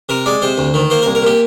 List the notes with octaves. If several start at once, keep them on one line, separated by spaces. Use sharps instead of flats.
C3 A#4
G#3 D5
C3 C5
D2
D#3
A#3 C5
A#4
C2
A#4
A#2 G4